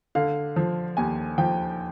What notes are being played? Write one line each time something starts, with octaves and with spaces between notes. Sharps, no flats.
D3 F5
F3
D#2 G#5
F3 G5